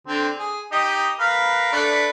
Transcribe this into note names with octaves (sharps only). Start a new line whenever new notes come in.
D3 C4
G#4
D#4 G4 D#5
A#4 B4 F5
A3 D4 B4